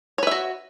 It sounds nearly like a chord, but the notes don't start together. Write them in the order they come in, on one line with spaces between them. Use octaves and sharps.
C#5 B4 E5 F#4